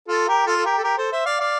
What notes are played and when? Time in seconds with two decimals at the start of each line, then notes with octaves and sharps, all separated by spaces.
0.08 F4 A4
0.28 G4 A#4
0.46 F4 A4
0.57 A4
0.65 G4 A#4
0.78 A4
0.83 G4 A#4
0.98 A4 C5
1.11 C5 E5
1.26 D5 F5
1.40 D5 F5